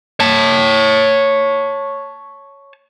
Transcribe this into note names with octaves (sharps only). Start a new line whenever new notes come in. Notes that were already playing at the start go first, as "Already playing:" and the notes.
C#5 A5